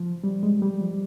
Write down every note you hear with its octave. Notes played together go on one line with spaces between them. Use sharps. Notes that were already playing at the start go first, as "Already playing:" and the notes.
Already playing: F3
G3
G#3
G3
F3